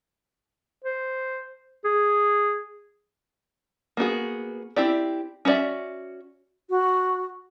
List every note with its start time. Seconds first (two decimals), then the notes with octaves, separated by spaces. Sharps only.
0.85 C5
1.85 G#4
3.97 A#3 B3 F#4 G#4
4.76 C4 E4 G4 D5
5.45 C#4 F#4 A#4 D5 E5
6.70 F#4